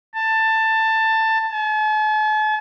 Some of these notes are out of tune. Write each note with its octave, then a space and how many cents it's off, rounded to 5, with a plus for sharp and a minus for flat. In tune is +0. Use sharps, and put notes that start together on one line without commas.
A5 +15
A5 -45